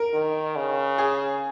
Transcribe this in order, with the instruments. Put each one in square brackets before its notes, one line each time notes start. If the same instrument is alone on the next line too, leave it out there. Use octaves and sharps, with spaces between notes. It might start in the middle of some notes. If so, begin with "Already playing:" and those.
Already playing: [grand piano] A#4
[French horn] D#3
C#3
[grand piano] G#4